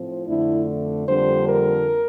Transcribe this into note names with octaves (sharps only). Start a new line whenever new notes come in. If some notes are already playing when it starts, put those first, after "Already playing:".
Already playing: A2 F3 C4
F2 D3 A3 D4 E4
F2 D3 G3 A#3 D4 C5
A#4